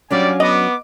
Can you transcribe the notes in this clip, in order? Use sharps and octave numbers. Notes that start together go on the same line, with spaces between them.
F#3 G3 C#4 D4 D5 F5 G#5 D6
B3 D#5 D6